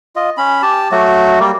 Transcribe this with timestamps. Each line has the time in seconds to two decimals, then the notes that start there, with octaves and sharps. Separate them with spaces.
0.16 F4 D#5
0.37 C#4 B5
0.62 G4 A5
0.92 F#3 A3 F#4
1.40 G3 A#3